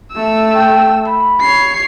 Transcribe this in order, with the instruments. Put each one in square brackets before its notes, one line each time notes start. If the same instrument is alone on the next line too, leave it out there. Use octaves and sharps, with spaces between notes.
[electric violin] A3 E6
[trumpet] G5
B5
[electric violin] C#5 C7